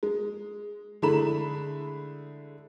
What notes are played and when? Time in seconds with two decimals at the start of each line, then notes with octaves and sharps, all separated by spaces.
0.03 G#3
1.02 D3 G#3 A3 E4 B5 E7